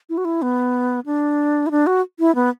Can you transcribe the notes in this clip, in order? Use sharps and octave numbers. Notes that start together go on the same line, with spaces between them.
E4
F#4
E4
B3
D4
E4
D4
F#4
E4
B3